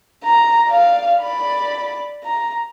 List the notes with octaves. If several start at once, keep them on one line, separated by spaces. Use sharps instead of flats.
A#5
D5 F5
D5 B5
A#5